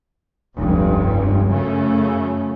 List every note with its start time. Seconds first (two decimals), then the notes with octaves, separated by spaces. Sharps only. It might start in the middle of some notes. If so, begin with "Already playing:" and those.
0.57 F1 C#2 G2
1.51 F#2 C#3 A3 C#4